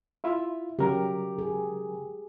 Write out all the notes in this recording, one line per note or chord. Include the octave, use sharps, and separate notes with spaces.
E4 F4 E5
C#3 F#3 G4 A#4
G#4